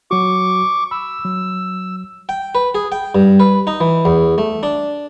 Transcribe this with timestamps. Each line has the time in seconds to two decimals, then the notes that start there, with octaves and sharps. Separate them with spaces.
0.11 F#3 F#4 C#6 D6
0.91 B5 E6
1.25 F#3
2.29 G5
2.55 B4
2.75 G#4
2.92 G5
3.15 G2
3.40 B4
3.67 D#4
3.81 E3
4.05 E2
4.38 A3
4.63 D4